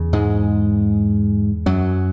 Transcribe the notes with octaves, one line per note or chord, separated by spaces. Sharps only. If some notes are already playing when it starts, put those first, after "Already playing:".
Already playing: E2 C#3
G#2 G#3
F#2 F#3